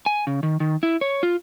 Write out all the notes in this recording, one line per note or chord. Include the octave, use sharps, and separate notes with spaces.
G#5
C#3
D#3
D#3
E4
C#5
F4